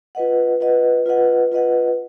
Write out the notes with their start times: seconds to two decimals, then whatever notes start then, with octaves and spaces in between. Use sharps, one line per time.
0.15 F4 B4 D#5 F#5
0.60 F4 B4 D#5 F#5
1.06 F4 B4 D#5 F#5
1.52 F4 B4 D#5 F#5